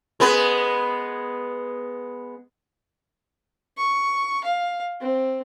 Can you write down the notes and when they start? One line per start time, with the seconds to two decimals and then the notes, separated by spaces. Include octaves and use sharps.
0.20 G#3 B3 B4
3.78 C#6
4.44 F5
5.01 C4